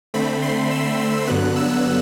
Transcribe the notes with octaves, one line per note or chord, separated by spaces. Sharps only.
D3 A3 C4 B5
C6
E6
E6
G2 D3 F#3 B3 F#6
E6